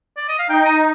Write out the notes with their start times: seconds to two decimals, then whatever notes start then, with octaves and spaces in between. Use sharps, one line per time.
0.17 D5
0.28 D#5
0.39 F5
0.50 D#4 G5
0.65 D#5